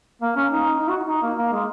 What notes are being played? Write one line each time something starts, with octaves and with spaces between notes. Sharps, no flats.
A#3
C#4
D#4
D#4
F#4
D#4
A#3
A#3
G#3